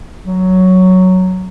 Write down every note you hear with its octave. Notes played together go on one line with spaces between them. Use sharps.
F#3